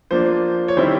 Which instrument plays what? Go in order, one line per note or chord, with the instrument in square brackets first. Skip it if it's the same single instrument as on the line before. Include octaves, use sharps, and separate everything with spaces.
[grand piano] F3 A#3 D4 C5
C#5
D#3 G3 C4 E4 C5